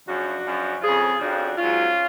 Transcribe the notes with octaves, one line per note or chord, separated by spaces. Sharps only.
F#2 C#3 F3 D4 F#4
F#2 C#3 F3
F2 C#3 F3 F4 G#4
F2 C#3 F3 D4 F#4
G#2 F#3 C#4 F4